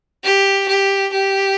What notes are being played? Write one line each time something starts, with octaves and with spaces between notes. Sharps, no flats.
G4
G4
G4